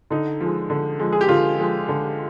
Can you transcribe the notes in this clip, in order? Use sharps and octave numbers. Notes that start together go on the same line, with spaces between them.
D3 D#4
F3 G#3
D3
F3 G#3
G#4
G4
D3 F4
F3 G#3
D3